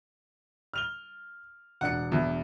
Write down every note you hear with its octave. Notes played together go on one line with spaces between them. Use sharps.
F6 F7 G7
E1 D4 F#5 C#7
E2